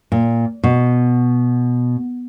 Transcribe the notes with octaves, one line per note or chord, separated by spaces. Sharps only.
A#2
B2